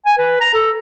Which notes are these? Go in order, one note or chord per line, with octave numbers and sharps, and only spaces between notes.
G#5
B4
A#5
A4